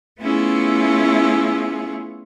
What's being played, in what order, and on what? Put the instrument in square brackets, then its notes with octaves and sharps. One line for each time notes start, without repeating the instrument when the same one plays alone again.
[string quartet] A3 B3 C#4 E4 F4 G#4